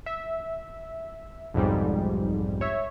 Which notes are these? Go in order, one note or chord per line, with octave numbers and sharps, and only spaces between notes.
E5
B1 F2 G#2 G3
C#5 E5